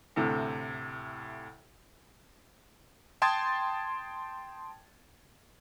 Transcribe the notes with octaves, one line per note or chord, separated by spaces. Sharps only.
D2 A2 C3
G5 A5 C6 D#6 G#6 A6